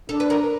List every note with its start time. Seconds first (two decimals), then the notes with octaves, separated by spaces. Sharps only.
0.09 D4 A4
0.20 B4
0.30 A#4